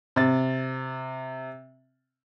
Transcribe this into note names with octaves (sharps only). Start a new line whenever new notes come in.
C3 A6